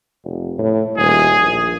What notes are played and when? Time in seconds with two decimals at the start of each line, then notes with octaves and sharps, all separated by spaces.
0.24 F1
0.58 A2
0.97 D#1 G#4
1.39 A#1